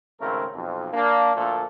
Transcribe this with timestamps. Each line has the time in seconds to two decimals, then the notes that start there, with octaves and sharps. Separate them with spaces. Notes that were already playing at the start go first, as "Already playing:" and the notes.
0.21 G#1 C#3 A3 C4 A#4
0.55 B1 F2
0.92 A#3 D4
1.35 D2 A#2 F3 A3 A4